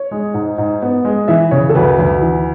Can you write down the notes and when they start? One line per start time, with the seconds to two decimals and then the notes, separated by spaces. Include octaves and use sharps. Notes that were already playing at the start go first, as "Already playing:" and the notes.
Already playing: C#5
0.11 G#3
0.34 G#2
0.58 G#2
0.82 B3
1.05 G#3
1.28 E3 E5
1.51 C#3 C#5
1.69 A4
1.75 D2 B4
1.99 D2
2.21 E3